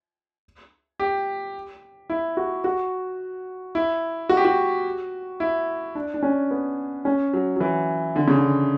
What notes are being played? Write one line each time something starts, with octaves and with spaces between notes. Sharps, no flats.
G4
E4
F#4
F#4
E4
F#4
G4
F#4
E4
D4
D4
C#4
B3
C#4
F#3
F#3
E3
D3
C#3
D3